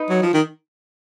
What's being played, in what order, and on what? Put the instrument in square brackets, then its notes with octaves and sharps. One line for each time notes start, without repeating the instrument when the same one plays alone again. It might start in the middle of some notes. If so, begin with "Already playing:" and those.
Already playing: [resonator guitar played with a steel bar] D#4 B4
[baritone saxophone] F#3
F3
D#3